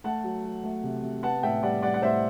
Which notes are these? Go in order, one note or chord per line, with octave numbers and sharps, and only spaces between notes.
A3 F#5 A5
F#3
F#3
A3
C3
C3
B3 F#5 A5
A2 E5 G5
G3 D5 F#5
G3 D5 F#5
F#5
A2 C5 E5